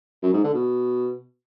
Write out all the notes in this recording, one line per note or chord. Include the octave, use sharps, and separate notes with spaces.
F#2
G#2
D3
B2